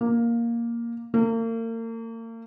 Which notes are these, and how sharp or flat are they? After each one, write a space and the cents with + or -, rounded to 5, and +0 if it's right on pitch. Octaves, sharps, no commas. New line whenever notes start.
A#3 +5
A#3 -40